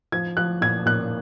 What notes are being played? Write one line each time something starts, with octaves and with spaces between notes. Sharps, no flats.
F3 G#6
F3 F#6
A#2 G#6
A#2 F#6